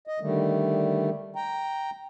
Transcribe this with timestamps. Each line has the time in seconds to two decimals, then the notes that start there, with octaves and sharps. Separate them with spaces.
0.07 D#5
0.20 D3 D#3 G3 A3
1.36 G5 A#5